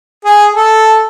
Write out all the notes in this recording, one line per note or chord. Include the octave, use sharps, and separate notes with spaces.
G#4
A4